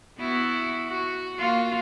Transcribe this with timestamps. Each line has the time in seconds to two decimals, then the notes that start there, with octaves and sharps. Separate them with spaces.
0.18 B3 E4 F#4
0.88 F#4
1.38 A#3 F4 F#4